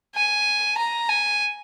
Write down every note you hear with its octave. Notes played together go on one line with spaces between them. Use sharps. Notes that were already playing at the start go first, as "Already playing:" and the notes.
G#5
A#5
G#5